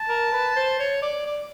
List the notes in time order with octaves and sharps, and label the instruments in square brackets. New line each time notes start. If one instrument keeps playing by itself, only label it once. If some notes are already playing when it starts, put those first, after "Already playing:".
Already playing: [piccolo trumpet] A5
[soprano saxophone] A#4
B4
C5
C#5
D5
D5